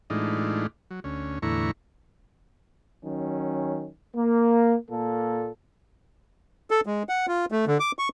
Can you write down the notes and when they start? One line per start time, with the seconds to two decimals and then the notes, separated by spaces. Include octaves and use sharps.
0.10 A2 E3 G#3 D4 D#4 F4
0.91 F#3
1.04 D2 C#4
1.42 E2 A2 D3 E4 A#5 C#6
3.03 D#3 F#3 C#4
4.15 A#3
4.90 A#2 A#3 A4
6.71 A4
6.86 G#3
7.09 F#5
7.28 F4
7.52 A3
7.67 D3
7.80 D6
7.99 C#6